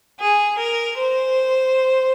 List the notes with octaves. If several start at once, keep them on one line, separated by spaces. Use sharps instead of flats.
G#4
A#4
C5